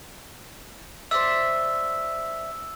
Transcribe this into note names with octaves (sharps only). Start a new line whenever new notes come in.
C5 D5 E5 E6